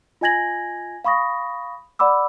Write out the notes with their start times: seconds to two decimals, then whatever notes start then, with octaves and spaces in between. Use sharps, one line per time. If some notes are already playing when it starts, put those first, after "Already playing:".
0.21 F4 D#5 G#5 G#6 A#6 F#7
1.04 F5 B5 C#6 D#6 A#6
1.99 D5 F#5 B5 D6 E6